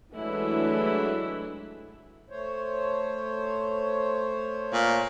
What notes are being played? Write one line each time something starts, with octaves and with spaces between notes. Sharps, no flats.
E3 F#3 G#3 A3 D4 E4
A3 C5 C#5
A#2